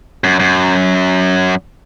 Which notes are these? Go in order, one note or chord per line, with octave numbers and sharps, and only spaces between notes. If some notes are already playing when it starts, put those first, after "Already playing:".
F#2
F#2